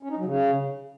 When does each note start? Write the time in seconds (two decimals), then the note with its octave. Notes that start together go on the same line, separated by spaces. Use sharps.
0.03 C#4
0.10 D#4
0.18 F#3
0.25 C#3